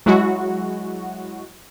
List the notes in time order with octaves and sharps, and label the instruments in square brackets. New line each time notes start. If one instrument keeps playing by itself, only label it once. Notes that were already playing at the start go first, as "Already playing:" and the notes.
[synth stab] F#3 G#3 E4 F#4